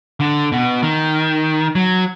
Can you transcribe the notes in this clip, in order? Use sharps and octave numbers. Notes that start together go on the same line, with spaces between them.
D3
B2
D#3
F#3